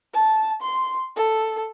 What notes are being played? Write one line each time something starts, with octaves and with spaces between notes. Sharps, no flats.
A5
C6
A4